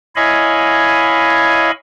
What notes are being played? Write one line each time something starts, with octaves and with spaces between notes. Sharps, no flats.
E4 C#5 D#5 F5 G#5 B5